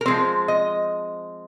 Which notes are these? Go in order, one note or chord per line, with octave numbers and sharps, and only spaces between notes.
A#4
F3 G#3 C4 C5
D#5